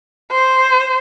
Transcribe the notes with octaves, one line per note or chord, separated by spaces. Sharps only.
C5